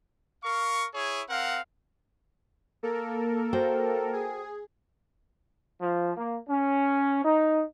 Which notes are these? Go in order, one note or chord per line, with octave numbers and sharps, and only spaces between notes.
A#4 F5 C#6
E4 G#4 C#5
C4 A#4 F5 F#5
A#3 A4 A#4
F#4 C5 G5
G#4
F3
A#3
C#4
D#4